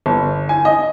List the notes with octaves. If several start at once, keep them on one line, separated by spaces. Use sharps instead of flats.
G1
G#5
D#5